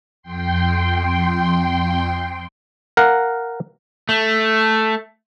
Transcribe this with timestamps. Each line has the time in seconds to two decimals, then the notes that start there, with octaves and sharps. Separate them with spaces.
0.22 F2 G5 C6
2.97 A#4 F5 F#5
4.09 A3